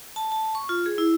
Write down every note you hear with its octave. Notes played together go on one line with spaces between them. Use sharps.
A5
A5
C#6
F4
G#4
E4